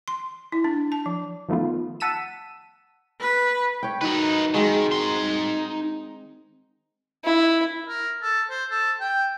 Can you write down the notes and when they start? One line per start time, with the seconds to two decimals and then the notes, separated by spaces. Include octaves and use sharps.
0.08 C6
0.52 E4
0.64 D4
0.92 A5
1.06 F3
1.49 D#3 F3 A3 B3 F4
2.00 F#5 A5 E6 B6 D#7 E7
3.21 B4
3.83 C#5 G5
4.01 D#3 F#3 D#4 B4
4.54 D#3 G#3 C4 F#4
4.91 D#4 C6
7.24 E4
7.89 A#4
8.22 A4
8.50 C5
8.70 A4
9.00 G5